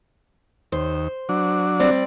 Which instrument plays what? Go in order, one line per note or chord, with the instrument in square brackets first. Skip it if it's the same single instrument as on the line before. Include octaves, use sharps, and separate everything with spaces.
[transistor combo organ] D#2 [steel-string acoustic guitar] C5
[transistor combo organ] F#3 D4
[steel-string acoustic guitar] G3 C4 D5